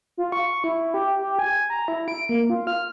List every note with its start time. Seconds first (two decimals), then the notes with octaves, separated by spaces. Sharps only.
0.18 F4
0.32 C#6
0.64 E4
0.94 G4
1.19 G4
1.39 G#5
1.70 A#5
1.88 E4
2.08 D7
2.29 A#3
2.50 F4
2.67 F6